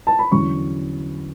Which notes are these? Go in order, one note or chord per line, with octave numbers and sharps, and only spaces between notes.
A5
B5
E2 D3 F#3 C#4 C#6